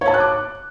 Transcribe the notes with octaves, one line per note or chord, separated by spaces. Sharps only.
C#5
A5
F#6
D6